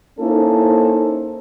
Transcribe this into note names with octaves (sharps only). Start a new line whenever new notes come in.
A#3 C#4 D#4 E4 A4 C5